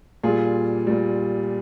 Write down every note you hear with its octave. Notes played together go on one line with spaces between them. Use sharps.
A#2 G3 F4 G#4
A#2 G3